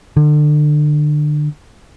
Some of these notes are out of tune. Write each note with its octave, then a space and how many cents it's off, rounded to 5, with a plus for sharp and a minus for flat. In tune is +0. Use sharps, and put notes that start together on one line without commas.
D3 +30